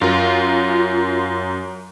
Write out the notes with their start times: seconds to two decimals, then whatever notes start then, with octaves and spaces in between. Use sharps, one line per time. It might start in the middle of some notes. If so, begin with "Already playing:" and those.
0.01 F#2 F4 A#4